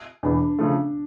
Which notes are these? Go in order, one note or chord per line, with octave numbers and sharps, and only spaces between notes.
E1 E2 E3 D4
C#3 F3 A3